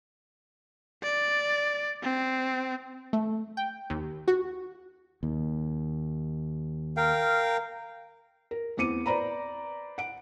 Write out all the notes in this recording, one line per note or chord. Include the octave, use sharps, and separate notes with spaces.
D5
C4
A3
G5
D#2
F#4
D#2
A#4 F5 G5
A#4
E2 B3 C4 D6 C#7 D#7
B4 C5 D5 A#5 B5
F#5 D7